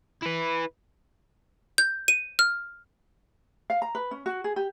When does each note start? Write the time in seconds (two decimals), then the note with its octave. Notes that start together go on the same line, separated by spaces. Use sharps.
0.22 E4 B4
1.78 G6
2.08 D#7
2.39 F6
3.70 F5
3.82 A#5
3.95 B4
4.11 C#4
4.26 F#4
4.44 G#4
4.56 G4